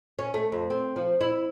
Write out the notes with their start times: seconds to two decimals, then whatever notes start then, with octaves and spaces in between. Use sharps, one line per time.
0.19 C#4
0.34 A3
0.52 F2
0.70 C4
0.96 F3
1.21 E4